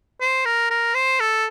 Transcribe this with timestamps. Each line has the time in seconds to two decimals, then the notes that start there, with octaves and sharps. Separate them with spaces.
0.21 C5
0.45 A#4
0.71 A#4
0.95 C5
1.20 A4